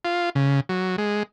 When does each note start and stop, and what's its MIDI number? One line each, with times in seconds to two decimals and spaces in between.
0.05 0.30 65
0.35 0.60 49
0.69 0.96 54
0.98 1.23 56